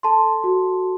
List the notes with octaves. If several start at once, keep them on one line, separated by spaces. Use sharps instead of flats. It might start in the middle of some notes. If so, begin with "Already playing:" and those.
A4 A5 C6
F#4